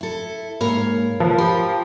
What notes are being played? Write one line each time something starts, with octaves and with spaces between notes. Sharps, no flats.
E4 A4
G#2 A#3 A#4 C#5 F5 B5
F3 B4
G4 A#4 B5